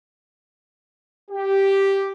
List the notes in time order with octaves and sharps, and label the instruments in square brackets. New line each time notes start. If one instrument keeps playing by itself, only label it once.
[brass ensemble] G4